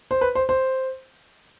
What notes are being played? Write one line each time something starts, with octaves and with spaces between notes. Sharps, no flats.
C5
B4
C5
C5